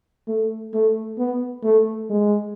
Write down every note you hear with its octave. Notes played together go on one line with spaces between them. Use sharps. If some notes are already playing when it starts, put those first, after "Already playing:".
A3
A3
B3
A3
G#3